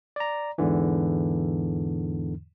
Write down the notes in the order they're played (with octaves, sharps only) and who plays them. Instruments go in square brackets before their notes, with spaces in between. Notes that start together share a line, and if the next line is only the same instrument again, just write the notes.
[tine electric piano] D5 A#5
E2 G#2 D3 E3